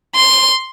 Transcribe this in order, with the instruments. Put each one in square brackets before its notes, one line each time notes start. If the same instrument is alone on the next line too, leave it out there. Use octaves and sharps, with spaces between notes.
[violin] C6